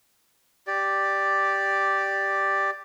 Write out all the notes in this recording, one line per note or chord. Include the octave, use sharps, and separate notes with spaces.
G4 D5